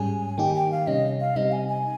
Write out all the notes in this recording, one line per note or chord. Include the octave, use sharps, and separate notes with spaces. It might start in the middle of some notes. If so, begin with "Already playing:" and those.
Already playing: G#2 G3 C#4 G#4 G#5
D#3 A#3 D#4 G4 G5
G5
F5
C3 G3 C#4 D#5
F5
C3 G3 C4 D#4 D#5
G#5
G#5